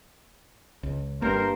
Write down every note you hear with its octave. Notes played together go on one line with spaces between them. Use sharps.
C#2
G1 G2 A#3 A#4 C5